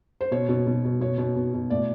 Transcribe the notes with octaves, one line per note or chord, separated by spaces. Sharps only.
C5
B2 C#5
B2
B2
B2
B2 C#5
B2
B2
B2
A2 D5